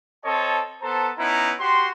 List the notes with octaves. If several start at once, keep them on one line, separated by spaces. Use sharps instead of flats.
C4 A4 C#5 D#5 A5
B3 A4 C5 A5 A#5
B3 C#4 D#4 E4 A#5
F#4 G4 C6